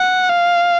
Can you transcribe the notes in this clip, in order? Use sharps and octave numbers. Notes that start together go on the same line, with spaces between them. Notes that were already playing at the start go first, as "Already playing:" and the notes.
Already playing: F#5
F5